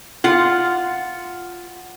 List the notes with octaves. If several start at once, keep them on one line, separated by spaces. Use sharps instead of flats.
F4 F#5